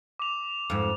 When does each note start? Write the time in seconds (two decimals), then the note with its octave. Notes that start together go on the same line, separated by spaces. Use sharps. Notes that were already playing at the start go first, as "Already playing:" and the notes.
0.19 D6 F7
0.70 F2 G#2